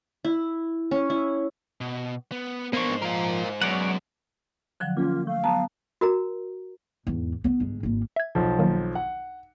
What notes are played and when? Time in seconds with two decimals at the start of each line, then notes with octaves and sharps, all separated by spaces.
0.25 E4
0.91 C#4
1.10 E4
1.81 B2
2.32 B3
2.73 G#2 A#3 B3 D4 C5 C#6
3.02 F3 F4 A#4
3.62 F#2 G#3 B3 C#5 D5 F#5
4.80 D3 F3 F#3 F#6
4.97 A#3 C#4 F4
5.27 A3 F5
5.44 F#3 B3 A5 A#5
6.01 F#4 A#4 A#5
7.07 E2 G#2
7.44 B3 C#4
7.60 G1 G#2
7.83 G#1 A#3
8.16 E5 G#6
8.35 B1 F3
8.59 D#3 F#3 A#3
8.95 F#5